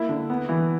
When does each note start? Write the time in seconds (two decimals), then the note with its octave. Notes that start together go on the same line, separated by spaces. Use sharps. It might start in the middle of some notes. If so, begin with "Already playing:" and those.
Already playing: A#3 E4
0.09 D3
0.30 B3
0.49 E3